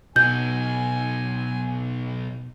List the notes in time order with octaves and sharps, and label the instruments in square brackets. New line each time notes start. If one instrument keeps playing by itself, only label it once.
[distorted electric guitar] B1 D#4 [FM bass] B2 [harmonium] G#5 [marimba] G6